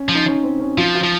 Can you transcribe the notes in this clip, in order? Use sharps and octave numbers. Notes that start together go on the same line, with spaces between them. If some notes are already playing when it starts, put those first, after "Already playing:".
Already playing: C#4
F3
D#4
C#4
C4
C#4
F3 F4
F4
F3